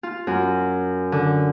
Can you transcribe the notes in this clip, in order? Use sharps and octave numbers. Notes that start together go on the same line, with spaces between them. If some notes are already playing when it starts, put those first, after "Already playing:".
F4
F#2
D3